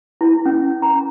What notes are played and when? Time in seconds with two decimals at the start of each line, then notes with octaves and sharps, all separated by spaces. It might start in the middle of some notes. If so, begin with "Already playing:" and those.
0.21 E4
0.46 C#4
0.82 A#5